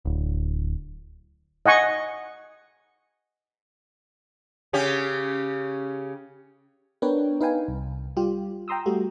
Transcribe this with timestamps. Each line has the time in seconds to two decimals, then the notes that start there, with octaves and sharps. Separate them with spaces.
0.05 D1
1.66 D#5 F#5 G#5 C#6
4.73 C#3 C#4 G4
7.02 B3 D4 A#4 B4 C#5 G5
7.41 D#4 B4 F5 G5 G#5
7.68 C2
8.17 G3 F4 G4
8.68 G5 A#5 C6 D#6 E6
8.86 G3 A3 F#4 G4